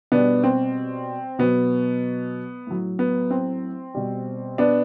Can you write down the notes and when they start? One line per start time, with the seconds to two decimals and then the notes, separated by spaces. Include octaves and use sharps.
0.12 B2 G3 B3 D4
0.44 C4
1.39 B2 F#3 B3
2.67 A2 F#3
2.99 B3
3.31 C4
3.94 B2 G3
4.58 B3 D4